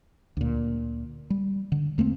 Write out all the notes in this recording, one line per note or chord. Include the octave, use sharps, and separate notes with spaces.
D2 A#2
G3
D3
E2 A3 A#3 C4